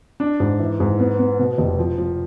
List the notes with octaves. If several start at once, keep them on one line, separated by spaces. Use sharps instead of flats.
D4
G#2
E3
G#2
B3
B3
B2
F1
F3
F3